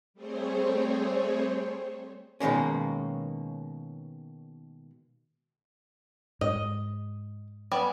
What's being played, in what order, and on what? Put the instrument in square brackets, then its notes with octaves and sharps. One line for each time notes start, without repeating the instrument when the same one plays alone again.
[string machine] G3 A3 C4 G#4 C5 C#5
[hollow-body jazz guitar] B2 D#3 G#3 A#3 C#4
[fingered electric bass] G#2 [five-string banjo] D#5
[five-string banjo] G3 B3 G#5